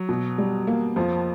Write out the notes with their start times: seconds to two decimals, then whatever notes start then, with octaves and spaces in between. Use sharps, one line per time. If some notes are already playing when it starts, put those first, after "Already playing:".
Already playing: F#3
0.09 B2
0.38 G3
0.67 A#3
0.96 F2 F3